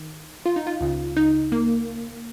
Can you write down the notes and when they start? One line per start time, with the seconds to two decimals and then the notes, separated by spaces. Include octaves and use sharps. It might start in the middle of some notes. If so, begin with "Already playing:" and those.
Already playing: D#3
0.46 F4
0.56 D#4
0.67 F4
0.81 C#2 C#3
1.17 D#4
1.52 A#3